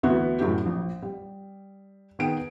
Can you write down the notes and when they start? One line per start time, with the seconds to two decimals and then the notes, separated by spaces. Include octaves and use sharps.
0.03 D2 E3 B3 F#4 E5
0.39 F#2 A2 G4
0.66 A#1
1.02 G3
2.19 D#3 B3 G#4 G5 D7